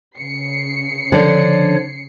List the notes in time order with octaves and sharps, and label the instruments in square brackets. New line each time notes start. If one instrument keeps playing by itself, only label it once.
[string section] C#3 C7 C#7
[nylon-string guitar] D3 D5 [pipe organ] F3 C#5